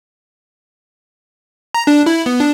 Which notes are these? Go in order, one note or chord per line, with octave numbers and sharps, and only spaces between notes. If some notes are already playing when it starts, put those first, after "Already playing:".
A#5
D4
E4
B3
D4